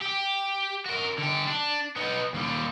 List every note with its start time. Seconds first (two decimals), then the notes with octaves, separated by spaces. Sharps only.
0.01 G4
0.86 F#4 A#4
1.18 D3 G4
1.47 D4
1.96 B3 D#4
2.34 D#2 G3